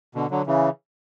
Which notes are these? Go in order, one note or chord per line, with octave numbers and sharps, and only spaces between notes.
B2 D3
D3 F#3
C#3 E3